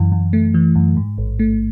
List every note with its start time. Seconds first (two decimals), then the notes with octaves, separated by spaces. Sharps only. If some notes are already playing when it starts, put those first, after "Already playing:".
Already playing: F#2 E3
0.12 F#2
0.33 A3
0.54 E3
0.75 F#2
0.97 G#2
1.18 A1
1.39 A3